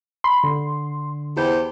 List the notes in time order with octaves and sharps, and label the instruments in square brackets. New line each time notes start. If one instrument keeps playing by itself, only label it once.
[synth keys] B5 [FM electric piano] C6
[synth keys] D3
[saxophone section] E2 G4 C5